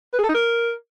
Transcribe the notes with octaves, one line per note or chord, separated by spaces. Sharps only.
B4
G#4
A4
D#4
A#4